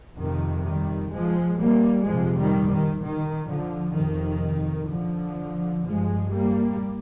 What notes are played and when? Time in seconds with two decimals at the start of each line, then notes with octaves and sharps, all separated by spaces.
0.17 F2 C3 D#3
0.64 D#3 G3
1.11 F3 G#3
1.58 G3 A#3
2.06 F2 C3 F3 G#3
2.37 D#3 G3
2.69 D#3
3.00 D#3
3.47 D3 F3
3.95 F2 C3 D#3
4.90 D3 F3
5.84 G2 F3 G#3
6.31 G3 A#3